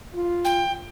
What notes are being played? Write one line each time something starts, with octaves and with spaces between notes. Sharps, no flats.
F4
G5